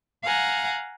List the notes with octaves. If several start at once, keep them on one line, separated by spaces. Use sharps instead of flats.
F5 F#5 G#5 A#5